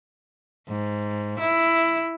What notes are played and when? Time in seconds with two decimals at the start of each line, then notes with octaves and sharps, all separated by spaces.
0.69 G#2
1.40 E4